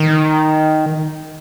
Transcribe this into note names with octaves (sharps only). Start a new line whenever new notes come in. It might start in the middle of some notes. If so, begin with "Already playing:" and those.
Already playing: D#3